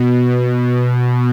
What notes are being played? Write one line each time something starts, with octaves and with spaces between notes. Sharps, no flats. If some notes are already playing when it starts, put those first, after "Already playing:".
Already playing: B2